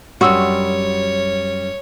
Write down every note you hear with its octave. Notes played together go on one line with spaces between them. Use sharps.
F#2 G3 F#4 C#5 C6 D#6 E6